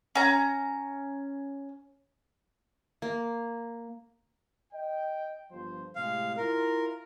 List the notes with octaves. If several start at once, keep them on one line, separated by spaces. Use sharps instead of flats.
C#4 A#5
A#3
D#5 G5
G1 F3 C5
A2 C3 G#3 F5
E4 F4 A#4